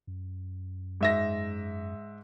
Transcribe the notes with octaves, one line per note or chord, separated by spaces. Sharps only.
F#2
G#2 E5 A#6